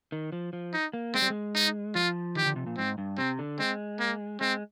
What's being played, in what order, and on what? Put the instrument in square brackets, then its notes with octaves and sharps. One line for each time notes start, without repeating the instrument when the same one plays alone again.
[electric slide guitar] D#3
F3
F3
[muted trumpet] D#4
[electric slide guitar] A#3
[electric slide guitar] G#3 [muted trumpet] C4
[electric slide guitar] G3
G#3
[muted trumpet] D#4
[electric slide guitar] F3 [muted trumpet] F4
[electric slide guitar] D#3 [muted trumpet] G4
[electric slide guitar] D3
C3
A#2
[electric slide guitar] G#2 [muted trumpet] C4
[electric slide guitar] G2
[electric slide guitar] C3 [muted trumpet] C4
[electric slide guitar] D3
[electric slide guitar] G#3 [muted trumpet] C4
[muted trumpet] A#3
[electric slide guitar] G#3 [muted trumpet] C4